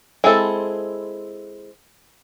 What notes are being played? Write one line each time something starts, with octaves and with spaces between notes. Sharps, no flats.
G#3 C4 E4 A4